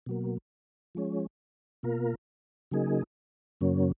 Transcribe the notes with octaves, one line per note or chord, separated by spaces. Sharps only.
B2 F#3 A#3
F3 G#3 C#4
B2 A#3 F4 A#4
C#3 F#3 A#3 D#4 G#4
F#2 C#3 F#3 A#3 C#4